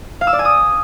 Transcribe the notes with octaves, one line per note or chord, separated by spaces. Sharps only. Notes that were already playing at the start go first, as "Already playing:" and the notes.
F5
E6
D5
G#5
D#6